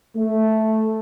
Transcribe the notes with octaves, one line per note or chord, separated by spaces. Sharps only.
A3